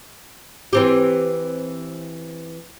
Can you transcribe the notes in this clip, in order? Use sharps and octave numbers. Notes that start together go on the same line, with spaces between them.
E3 C4 G4